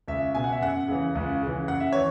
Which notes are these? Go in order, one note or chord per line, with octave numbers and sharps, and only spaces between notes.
C#2 E5
B2 G#5
F#5
E5
F#2 F#5
C#3 E3
C#2
C#3 E3
F#2 F#5
E5
E3 C#5